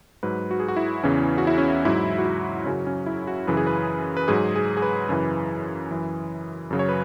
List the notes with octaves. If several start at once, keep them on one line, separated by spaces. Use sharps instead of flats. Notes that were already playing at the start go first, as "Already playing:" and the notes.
G#2 F#3 B4
F#4
G#4
F#4
E4
E2 C#3 E3 C#4
F#4
E4
C#4
G#2 F#3 E4
F#4
E4
F#2 C#3 F#3 C#4
C#4
E4
F#4
F#2 C#3 E3 B4
G#4
B4
B4
G#2 F#3 G#4
G#4
G#4
B4
F#2 C#3 E3
F#2 E3
F#2 C#3 F#3
C#5
B4